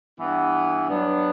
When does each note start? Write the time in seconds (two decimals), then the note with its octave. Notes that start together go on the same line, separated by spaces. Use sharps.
0.18 G2 E3 B3
0.88 G2 F#3 B3 D4